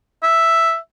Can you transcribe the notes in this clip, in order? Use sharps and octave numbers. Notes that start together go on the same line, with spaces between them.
E5